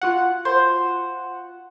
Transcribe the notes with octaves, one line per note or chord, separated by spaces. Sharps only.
F4 F#4 F#5
C5